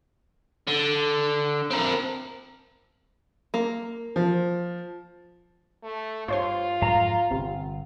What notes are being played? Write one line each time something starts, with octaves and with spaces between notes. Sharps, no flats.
D3
C4 A#4
A#3
F3
A3
G2 F4 C5 C#5 C6
F2 G#2 F#3 F5 A#5
G1 C3